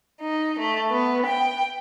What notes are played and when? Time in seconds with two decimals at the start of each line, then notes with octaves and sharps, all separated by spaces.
0.20 D#4
0.59 A3
0.90 B3
1.25 G5